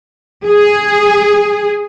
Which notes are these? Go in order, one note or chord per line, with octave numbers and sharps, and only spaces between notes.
G#4